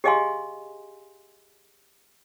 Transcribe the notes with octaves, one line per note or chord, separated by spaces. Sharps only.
G4 G#4 D#5 F5 G#5 C6